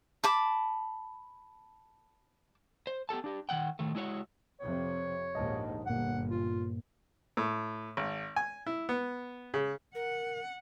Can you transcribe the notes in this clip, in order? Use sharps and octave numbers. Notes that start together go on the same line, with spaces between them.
A5 B5 D6
C5
B3 G4 A4 A5
D4 G4
D#3 F3 F#5 G5
A2 D#3 A3
G#3 E4 F#4 C#5
F2 C3 C#5
A#1 D#2 G#2 D#5 A5
G1 G2 A#2 A#3 F#5
F4
A2
G#1
G#5
E4
B3
C#3
A#4 F#5